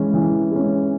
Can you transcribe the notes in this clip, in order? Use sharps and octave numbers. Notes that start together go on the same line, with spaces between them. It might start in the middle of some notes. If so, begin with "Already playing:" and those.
Already playing: E3 G#3 C#4
E3
G#3 C#4